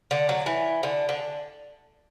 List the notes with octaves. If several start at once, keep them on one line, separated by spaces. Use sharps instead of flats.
D3
F#3
E3
D3
D3